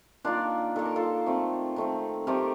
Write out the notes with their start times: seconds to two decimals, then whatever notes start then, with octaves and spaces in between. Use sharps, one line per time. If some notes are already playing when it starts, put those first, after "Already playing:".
0.25 D#3 A#3 D4 F4
0.76 D#3 A#3 A4
0.85 A#4
0.96 F4 A4
1.26 D#3 A3 C4
1.76 D#3 A3 C4
2.27 D#3 A3 C4 G4 A#4